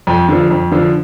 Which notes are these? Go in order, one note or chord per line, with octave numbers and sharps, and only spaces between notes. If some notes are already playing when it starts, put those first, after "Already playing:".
F2
D3 F3
F2
D3 F3